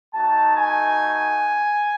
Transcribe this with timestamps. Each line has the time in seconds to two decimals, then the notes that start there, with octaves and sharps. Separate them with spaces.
0.13 A3 D#4 F#4 A5
0.56 G#5